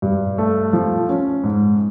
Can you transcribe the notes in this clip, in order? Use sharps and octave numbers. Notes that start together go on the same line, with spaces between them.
G2
A3
F3
C#4
G#2